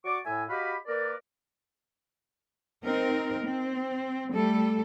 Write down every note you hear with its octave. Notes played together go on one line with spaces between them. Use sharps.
F#4 D5 C#6 D6
A2 E5 G#5
F#4 G4 D#5 F5 B5
A#3 A#4 B4 D5
C4 D#4 A#4
C4
G3 A3 A4